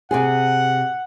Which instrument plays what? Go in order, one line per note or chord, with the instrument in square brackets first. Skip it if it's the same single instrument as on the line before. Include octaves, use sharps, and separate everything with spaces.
[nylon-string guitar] C3 C4 G#4 [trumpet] F#5